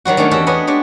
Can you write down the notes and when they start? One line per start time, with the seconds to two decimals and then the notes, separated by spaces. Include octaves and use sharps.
0.05 D#3 F#3 G3 F#4
0.17 D#3 A3 C#4 D4 G#4
0.31 E2 F#4 G4 E5 G5 A5
0.47 B3 D4 B4 C#5 D#5
0.67 G#3 D4 G4 C#5